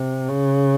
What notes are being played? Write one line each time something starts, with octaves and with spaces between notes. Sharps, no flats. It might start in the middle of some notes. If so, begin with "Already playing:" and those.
Already playing: C3
C#3